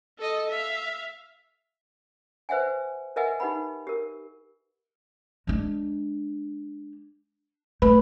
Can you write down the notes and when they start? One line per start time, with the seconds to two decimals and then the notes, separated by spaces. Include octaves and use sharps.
0.19 A4 D#5
0.50 E5 F5
2.49 B4 C5 E5 F#5 G#5
3.16 A#4 B4 D#5 E5 F#5 G#5
3.40 D#4 G4 B4 F#5 B5
3.87 G4 A#4
5.47 G#3 D4
7.82 A3 B4